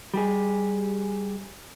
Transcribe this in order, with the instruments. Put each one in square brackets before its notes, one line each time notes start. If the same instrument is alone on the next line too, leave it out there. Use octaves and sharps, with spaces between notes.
[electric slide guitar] G3 G4 G#4